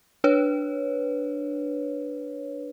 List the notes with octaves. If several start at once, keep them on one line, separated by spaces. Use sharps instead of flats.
D4 B4 C#5